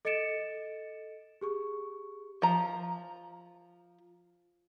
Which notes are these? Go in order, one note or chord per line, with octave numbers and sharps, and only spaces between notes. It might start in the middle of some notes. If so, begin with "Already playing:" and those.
A4 D#5 A6 C#7 D7 E7
G4 G#4 C#6
F3 A#5